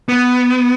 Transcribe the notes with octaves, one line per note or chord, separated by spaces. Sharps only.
B3